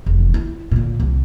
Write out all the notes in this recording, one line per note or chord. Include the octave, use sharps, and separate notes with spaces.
F1 E2
E4
A#2 D3
C2